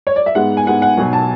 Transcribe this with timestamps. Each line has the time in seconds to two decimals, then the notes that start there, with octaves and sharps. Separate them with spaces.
0.07 C#5
0.16 D5
0.26 E5
0.35 G#2 G#3 B3 F#5
0.57 G#5
0.66 G#2 G#3 B3 F#5
0.82 F#5
0.97 B1 B2 F#3 G#5
1.13 A5